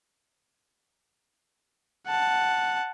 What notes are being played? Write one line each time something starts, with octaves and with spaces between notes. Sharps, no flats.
F#5 A5